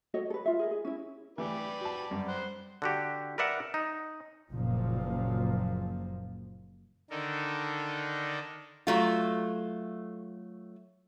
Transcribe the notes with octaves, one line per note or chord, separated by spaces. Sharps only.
F#4 A4 C#5 D#5
A4 B4
F4 E5
G#4 A#4 D#5
G#4
C#4 E4
E3 A3 G4 B4 D5
F#4 A5
F#2 G3
C5 F#5
D3 F#4 G4
A#4 B4 D5 E5 F#5
D#4
F#1 A#2 F3
D3 D#3 D4 D#4 A4 A#4
F#3 A3 F4